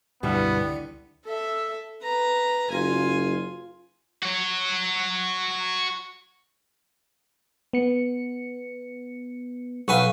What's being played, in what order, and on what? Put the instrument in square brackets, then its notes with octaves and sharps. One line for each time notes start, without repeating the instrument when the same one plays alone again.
[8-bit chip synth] C#2 D3 [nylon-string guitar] G2 B2 G3 [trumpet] B3 [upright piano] D4 E4
[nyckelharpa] A4 E5
B4 A#5
[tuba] F#1 [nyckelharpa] F4 G#5
[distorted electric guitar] F#4 C#5
[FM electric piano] B3 C#7
[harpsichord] B1 B4 G#5 [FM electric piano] F5 F#5 C#6